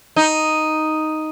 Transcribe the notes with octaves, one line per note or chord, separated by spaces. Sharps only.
D#4